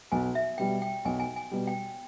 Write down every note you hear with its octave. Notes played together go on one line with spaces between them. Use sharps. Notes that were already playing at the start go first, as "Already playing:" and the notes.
B1 G#5
E5
B2 G3 G5
G5
B1 G#5
G#5
G#5
B2 G3
G5